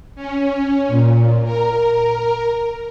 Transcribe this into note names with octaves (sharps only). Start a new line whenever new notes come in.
C#4
A#2
A#4